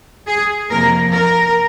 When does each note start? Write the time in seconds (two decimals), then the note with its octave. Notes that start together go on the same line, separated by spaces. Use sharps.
0.28 G#4
0.70 F2 C3 F3 A#3 A#4
1.13 A#4